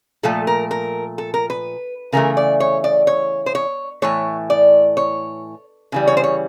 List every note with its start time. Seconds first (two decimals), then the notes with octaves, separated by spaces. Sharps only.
0.23 A#2 F3 A3 A4
0.47 A#4
0.71 A#4
1.18 A4
1.34 A#4
1.50 B4
2.12 C#3 E3 A3 A#4
2.37 D5
2.60 C#5
2.84 D5
3.07 C#5
3.46 C5
3.55 C#5
4.02 A2 E3 A3 C#5
4.50 D5
4.97 C#5
5.92 C#3 E3 G3
6.07 C#5
6.17 C5
6.24 C#5